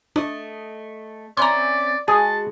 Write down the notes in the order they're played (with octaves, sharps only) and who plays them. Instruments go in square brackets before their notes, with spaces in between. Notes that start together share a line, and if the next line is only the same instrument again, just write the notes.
[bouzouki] A3 D#5 [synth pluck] D4
[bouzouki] C4 C#4 E4 [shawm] D5 [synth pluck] A#5 C6
[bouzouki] G#3 F#4 [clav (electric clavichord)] G#4 [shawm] A5